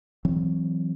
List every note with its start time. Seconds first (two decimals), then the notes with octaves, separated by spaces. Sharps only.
0.25 E3 F#3 C4